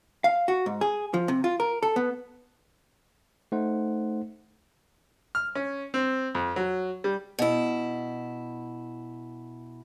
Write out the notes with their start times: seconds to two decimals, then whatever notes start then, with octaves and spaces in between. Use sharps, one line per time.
0.24 F5
0.48 F#4
0.66 G#2
0.81 G#4
1.14 F3
1.28 C3
1.44 F4
1.60 A#4
1.83 A4
1.96 B3
3.52 A3 D#4 C5 F#5
5.35 F6
5.55 C#4
5.94 C4
6.35 F2
6.56 F#3
7.04 G3
7.39 B2 E4